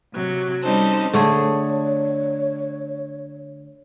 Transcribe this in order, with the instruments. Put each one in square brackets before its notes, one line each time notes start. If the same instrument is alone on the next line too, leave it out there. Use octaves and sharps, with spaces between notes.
[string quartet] C3 F#3
G3 C4 C#4 D#4 A4 C5
[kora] D3 A3 G#4 [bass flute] C#5